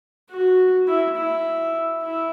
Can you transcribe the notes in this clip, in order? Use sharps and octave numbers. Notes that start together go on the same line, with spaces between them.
F#4
E4
E4
E4